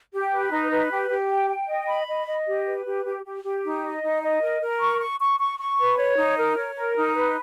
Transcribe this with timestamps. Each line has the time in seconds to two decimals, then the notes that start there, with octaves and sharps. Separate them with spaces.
0.13 G4
0.32 B4
0.52 D#4
0.71 B4
0.91 G4
1.10 G4
1.29 G5
1.49 G5
1.68 D#5
1.88 B5
2.07 D#5
2.26 D#5
2.47 G4
2.66 B4
2.86 G4
3.05 G4
3.24 G4
3.44 G4
3.64 D#4
3.83 D#5
4.02 D#4
4.22 D#5
4.41 A#4
4.61 A#4
4.81 C#6
5.00 C#6
5.20 C#6
5.39 C#6
5.59 C#6
5.79 B4
5.98 C#5
6.17 D#4
6.37 A#4
6.56 C#5
6.76 A#4
6.95 D#4
7.15 B4